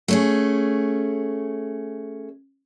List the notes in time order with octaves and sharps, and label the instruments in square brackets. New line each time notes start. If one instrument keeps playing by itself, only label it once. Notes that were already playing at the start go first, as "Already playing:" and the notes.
[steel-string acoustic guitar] A3 C#4 G#4